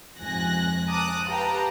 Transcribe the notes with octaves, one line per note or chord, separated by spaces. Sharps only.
F2 G#2 C3 G#5 F#6 A#6
A5 A#5 D6 D#6 F#6
G4 B4 F5 G5 A5 A#5